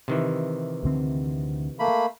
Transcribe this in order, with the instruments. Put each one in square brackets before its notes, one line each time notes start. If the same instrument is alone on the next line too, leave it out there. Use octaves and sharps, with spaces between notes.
[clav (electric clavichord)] C3 D#3 E3
[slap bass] D2 D3 C4
[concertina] A3 A#3 B5